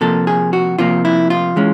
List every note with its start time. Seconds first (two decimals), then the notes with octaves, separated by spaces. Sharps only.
0.01 C3 F3 A#3 A4
0.27 G#4
0.53 F#4
0.79 C3 F3 A#3 F4
1.05 E4
1.30 F4
1.56 E3 G#3 C#4